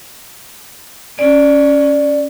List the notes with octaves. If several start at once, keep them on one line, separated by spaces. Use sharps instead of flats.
C#4 D5